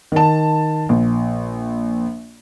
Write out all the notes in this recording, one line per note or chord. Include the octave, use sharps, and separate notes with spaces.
D#3 A5
A#1